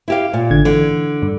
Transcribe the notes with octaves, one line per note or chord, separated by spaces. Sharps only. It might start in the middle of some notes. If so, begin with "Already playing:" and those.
E4 G4 F5
A#2
G#1 D3 G#6
D3 E3
G2